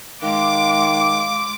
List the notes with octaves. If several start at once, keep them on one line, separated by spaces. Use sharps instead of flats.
D#3 G#3 F5 D6